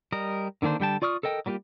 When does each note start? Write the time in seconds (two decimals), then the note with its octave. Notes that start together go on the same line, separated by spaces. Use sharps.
0.12 G3 A#4 D#5
0.62 D3 D#3 A#3 D4 C5
0.80 D3 G3 G5 A5
1.02 F4 D5 C#6 D#6 F6
1.23 A4 A#4 D#5 G5
1.46 F#3 G3 A#3 F4 G4